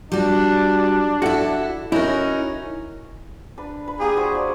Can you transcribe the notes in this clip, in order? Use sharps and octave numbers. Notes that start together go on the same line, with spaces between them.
G3 D4 F#4
E4 F#4 A4 F#5
C#4 D#4 E4 F#4 A#4
D4 B4
B4
A#3 G4 G#4
G3 F#4 C5
D5